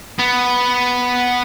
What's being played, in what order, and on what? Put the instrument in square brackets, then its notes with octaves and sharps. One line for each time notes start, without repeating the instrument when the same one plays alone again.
[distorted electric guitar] B3